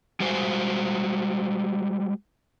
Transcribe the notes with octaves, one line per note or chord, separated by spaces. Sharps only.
G3 G#3 F#4 C5 G#5